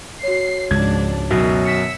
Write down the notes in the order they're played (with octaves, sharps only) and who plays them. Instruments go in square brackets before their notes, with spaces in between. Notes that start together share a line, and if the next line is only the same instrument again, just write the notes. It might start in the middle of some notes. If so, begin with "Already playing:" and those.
[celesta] F#4 C#5 [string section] C7
[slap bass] C#2 [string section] G#2 F3 D4 [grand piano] G#6
[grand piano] F#2 B2 F#3 [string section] D#3
[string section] E6 [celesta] B6 C#7